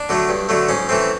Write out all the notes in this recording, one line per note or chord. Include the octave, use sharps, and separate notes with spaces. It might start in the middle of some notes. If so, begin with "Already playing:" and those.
Already playing: D4
D3 F#3 A3
G2
D3 F#3 A3
G#2 C#4
E3 A3 C4